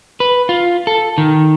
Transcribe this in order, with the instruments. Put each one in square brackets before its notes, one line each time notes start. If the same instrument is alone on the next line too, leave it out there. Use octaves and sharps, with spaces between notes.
[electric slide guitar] B4
F4
A4
D#3